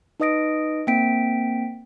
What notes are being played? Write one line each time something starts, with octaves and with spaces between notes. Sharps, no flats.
D#4 B4 D#5 D#6 A#6 D7
A#3 C4 G5 B6 D7